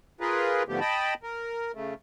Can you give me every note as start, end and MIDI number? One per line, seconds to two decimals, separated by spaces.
0.21 0.63 65
0.21 0.63 68
0.21 0.63 70
0.21 0.63 71
0.69 0.80 44
0.69 0.80 50
0.69 0.80 53
0.69 0.80 57
0.69 0.80 59
0.69 0.80 67
0.80 1.14 75
0.80 1.14 79
0.80 1.14 81
0.80 1.14 83
1.23 1.72 70
1.75 1.94 49
1.75 1.94 57